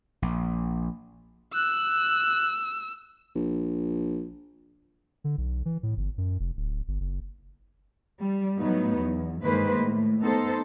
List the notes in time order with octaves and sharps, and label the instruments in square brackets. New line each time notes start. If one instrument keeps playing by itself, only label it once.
[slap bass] A#1
[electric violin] E6 [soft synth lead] F#6
[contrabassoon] A#1
[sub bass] D3
B1
E3
A2
G1
F#2
F1
D1
G1
F#1
[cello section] G3
A2 F#3 B3 D#4
E2
G2 D#3 G#3 A#3 B4 C5
A2
B3 D#4 A4 C5